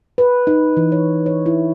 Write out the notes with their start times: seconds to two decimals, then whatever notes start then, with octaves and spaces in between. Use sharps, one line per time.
0.18 B4
0.47 D#4
0.77 E3
0.92 C#5
1.26 C#5
1.46 E4